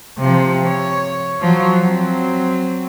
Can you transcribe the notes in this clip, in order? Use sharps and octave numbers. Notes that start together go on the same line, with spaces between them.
C3 F3
C#5
F3 F#3
F#3 C4